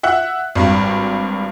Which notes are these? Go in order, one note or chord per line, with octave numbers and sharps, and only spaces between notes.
E5 F#5 F#6
G#1 G2